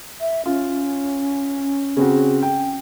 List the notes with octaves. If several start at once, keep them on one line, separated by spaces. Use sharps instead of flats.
E5
C#4 F4
C#3 C4 F#4
G5